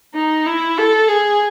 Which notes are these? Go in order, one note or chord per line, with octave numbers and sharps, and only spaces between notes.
D#4
E4
A4
G#4